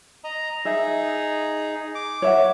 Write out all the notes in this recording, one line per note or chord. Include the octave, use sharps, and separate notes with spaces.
D#5 A#5
D#4 G#4 E5
D6
C#5 E5 F#5